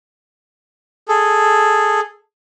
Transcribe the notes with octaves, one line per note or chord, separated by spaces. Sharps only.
G#4 A4